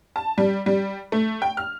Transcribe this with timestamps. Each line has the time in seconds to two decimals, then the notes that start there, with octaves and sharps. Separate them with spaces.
0.16 A5
0.38 G3
0.66 G3
1.12 A3
1.42 G5
1.57 F6